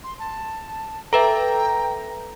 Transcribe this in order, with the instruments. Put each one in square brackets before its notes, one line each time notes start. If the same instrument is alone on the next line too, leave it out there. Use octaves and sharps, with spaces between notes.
[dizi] C6
A5
[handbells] A4 B4 E5 [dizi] G5 [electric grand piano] A#5